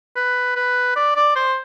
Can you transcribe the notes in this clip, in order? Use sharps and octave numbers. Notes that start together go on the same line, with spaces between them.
B4
B4
D5
D5
C5